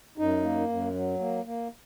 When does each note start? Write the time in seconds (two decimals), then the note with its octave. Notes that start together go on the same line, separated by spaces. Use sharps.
0.18 F#2 D#4
0.43 A#3
0.69 F#2
0.94 F#3
1.20 A#3
1.45 A#3